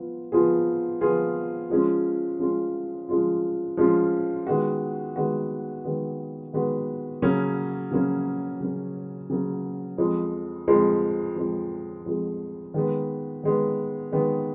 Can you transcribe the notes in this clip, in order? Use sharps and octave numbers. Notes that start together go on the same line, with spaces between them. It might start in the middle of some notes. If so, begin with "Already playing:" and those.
Already playing: F3 B3 F4
F3 B3 F4 G#4
F3 B3 F4 G#4
F3 G#3 C#4 F4
F3 G#3 C#4 F4
F3 G#3 C#4 F4
F3 G#3 C#4 F4
D#3 G#3 B3 F#4
D#3 G#3 B3 F#4
D#3 G#3 B3 F#4
D#3 G#3 B3 F#4
C#3 F#3 A#3 C#4
C#3 F#3 A#3 C#4
C#3 F#3 A#3 C#4
C#3 F#3 A#3 C#4
F2 F3 G#3
F2 F3 G#3
F2 F3 G#3
F2 F3 G#3
D#3 G#3 B3
D#3 G#3 B3
D#3 G#3 B3